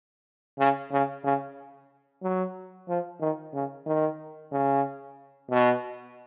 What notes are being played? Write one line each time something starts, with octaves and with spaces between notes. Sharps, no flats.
C#3
C#3
C#3
F#3
F3
D#3
C#3
D#3
C#3
B2